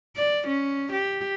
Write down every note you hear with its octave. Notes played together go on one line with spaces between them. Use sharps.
D5
C#4
G4